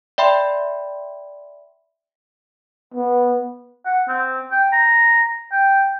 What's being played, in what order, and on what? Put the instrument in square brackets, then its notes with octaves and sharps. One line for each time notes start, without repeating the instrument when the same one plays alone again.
[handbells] D5 E5 G5 B5 C6
[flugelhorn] B3
[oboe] F#5
C4
G5
A#5
G5